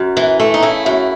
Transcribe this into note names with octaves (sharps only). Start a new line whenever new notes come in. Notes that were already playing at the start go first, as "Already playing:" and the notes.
Already playing: F#2
E3
A3
D#4
C#3 E4
F#2